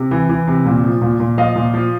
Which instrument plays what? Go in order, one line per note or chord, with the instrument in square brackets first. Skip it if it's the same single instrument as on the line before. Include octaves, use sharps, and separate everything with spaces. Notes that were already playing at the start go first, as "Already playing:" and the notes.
Already playing: [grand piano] C3
E3
E3
C3
A#2
F3
A#2
A#2
F3 D#5 F5
A#2
F3